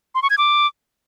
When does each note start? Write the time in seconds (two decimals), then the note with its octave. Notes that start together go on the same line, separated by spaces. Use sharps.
0.15 C6
0.22 C#6
0.30 G#6
0.38 D6